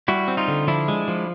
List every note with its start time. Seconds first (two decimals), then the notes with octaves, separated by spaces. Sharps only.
0.08 G3 E4 F#4
0.28 C4
0.37 D#4 F4
0.48 D3
0.67 F3 D4 E4
0.88 G#3
1.08 F3